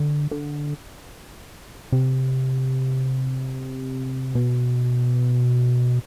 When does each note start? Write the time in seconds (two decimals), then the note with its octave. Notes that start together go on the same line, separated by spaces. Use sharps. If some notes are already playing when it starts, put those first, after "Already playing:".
Already playing: D3
0.31 D3
1.92 C3
4.35 B2